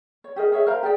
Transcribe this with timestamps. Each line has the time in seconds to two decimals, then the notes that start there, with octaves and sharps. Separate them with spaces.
0.24 C#5
0.36 G4 G#4 A#4 D#5
0.52 G#4 C#5 E5
0.66 A#4 C5 F5 A#5
0.83 G4 G#4 D5 G5